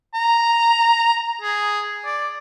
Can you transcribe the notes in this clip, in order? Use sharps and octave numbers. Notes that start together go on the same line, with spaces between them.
A#5
G#4
D5